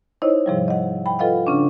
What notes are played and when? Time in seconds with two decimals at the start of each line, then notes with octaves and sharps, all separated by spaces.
0.22 D#4 E4 C5 C#5 D#5
0.46 G#2 C3 F3 G3
0.68 D#5 F#5
1.06 G5 B5
1.19 F4 A4 B4 D#5 F5 F#5
1.47 C#3 C#4 D4